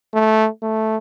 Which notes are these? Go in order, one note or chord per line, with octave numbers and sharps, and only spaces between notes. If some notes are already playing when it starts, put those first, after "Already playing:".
A3
A3